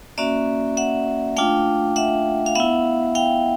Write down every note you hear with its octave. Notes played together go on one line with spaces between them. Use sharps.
A#3 C#4 F#4 D5 E5
E5 F#5
A3 D4 F4 F5 G5
E5 F#5
F5
B3 E4 E5 F#5
F5 G5